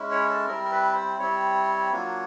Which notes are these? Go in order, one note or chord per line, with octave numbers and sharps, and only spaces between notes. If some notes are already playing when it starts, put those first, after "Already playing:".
Already playing: G#3 C#4 E4
C#5
A4
G3 C4 E4 A#4
A#4
B4
C5
G3 C4 E4 C#5
F#3 A#3 D4 F4